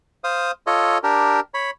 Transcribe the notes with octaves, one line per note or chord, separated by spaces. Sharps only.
C5 F5 D#6
F4 A4 C#5 D#5
D4 G4 A#4
C#5 B5